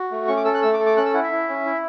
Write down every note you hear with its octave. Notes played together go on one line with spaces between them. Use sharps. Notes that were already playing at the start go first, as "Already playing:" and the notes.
Already playing: F#4
A3
C#4 C#6
D6
A4 E6
F#6
A3 E6
D6
A4
D6
C#4 F#6
E6
E4 F#5
E5
E4
C#4
E4